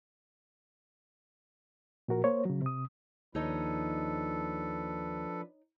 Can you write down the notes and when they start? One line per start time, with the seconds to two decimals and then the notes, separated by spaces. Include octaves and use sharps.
2.08 A#2 F3 F#4 A#4
2.24 A#3 C5 C#5
2.45 C#3 F#3
2.62 C3 D#6
3.35 D#2 F3 D4 D#4 A4 B4 C#5 D#5